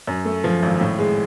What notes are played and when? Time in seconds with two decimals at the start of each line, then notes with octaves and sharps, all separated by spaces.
0.07 F#2
0.25 A3
0.44 F3
0.62 G#1
0.80 A2
0.99 G#3